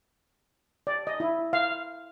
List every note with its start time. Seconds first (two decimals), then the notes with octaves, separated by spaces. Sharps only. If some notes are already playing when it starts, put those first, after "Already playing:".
0.87 D5
1.07 D#5
1.20 E4
1.53 F5